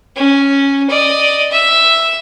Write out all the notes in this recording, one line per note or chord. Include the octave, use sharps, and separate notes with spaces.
C#4
D5 D#5
E5 E6